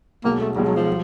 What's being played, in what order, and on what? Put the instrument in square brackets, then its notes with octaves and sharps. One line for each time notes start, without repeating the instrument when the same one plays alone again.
[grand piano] B1 B2 G#3 [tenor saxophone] A#3
[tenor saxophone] A3
[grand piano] B1 B2 G#3 [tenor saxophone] G3
[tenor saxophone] F#3
F3
[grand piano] G3